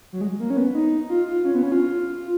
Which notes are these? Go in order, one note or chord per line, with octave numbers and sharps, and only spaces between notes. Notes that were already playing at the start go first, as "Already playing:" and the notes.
F#3
G#3
A#3
C#4
B3
D#4
F4
F4
C#4
B3
C#4
F4